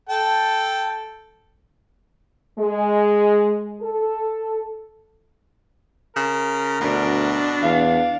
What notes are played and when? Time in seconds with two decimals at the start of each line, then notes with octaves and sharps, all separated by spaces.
0.09 A4 G5 A5
2.59 G#3
3.81 A4
6.16 C#3 A#4
6.81 D2 B2 D4
7.63 E2 F5